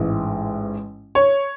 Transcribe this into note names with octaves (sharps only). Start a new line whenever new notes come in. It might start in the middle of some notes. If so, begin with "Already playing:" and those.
Already playing: A1 G#2 E3 G#3
C#5